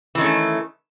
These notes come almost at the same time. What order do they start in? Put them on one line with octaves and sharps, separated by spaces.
E3 D#3 C#4 A3